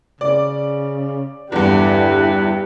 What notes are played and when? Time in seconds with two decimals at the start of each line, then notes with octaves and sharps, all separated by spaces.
0.21 C#3 D5
1.52 E2 G2 D3 E4 G4 B4